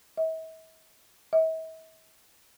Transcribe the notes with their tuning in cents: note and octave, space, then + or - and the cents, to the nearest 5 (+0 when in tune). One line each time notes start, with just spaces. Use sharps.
E5 -45
E5 -45